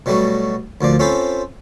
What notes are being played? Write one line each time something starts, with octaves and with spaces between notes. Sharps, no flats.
B2 F#3 G3 A3 F#4
D2 A#2 F3 D5
C4 C#4 F4 A4 C5 B5